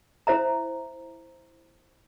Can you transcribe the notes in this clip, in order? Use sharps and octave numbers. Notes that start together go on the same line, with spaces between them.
E4 C5 E5 A#5